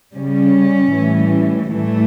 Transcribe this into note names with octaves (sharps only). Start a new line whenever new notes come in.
C#3 G3 C#4
A2 E3 G3
A2 E3 G3 A3